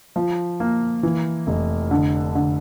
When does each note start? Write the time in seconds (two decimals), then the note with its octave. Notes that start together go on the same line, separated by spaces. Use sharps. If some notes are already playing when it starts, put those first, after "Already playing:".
0.16 F3
0.60 A#3
1.03 E3
1.47 F1
1.91 D3
2.35 D3